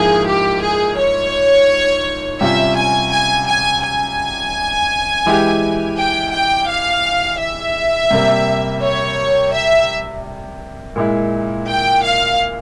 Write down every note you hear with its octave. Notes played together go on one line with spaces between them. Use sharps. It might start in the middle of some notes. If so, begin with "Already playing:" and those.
Already playing: G#2 F3 A#3 E4 G#4
G4
G#4
C#5
C3 G3 C#4 F4 E5
G#5
G#5
G#5
G#5
E3 G#3 E4 G4
G5
G5
F5
E5
C3 G3 A#3
C#5
E5
A#2 G#3 E4
G5
F5